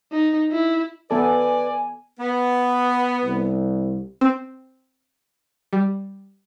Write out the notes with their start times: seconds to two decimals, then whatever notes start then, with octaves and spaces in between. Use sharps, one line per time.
0.12 D#4
0.52 E4
1.11 B3 A4 B4 D5 G#5
2.19 B3
3.24 C2
4.21 C4
5.73 G3